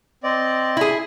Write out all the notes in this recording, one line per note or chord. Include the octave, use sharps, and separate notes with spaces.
C4 D5 D#5
E4 G#4